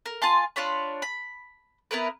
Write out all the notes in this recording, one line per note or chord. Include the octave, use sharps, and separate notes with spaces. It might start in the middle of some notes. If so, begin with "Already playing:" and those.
A#4
F4 G#5 A5 C6
D4 F4 C#5 B5
B5
B3 E4 A#4 B4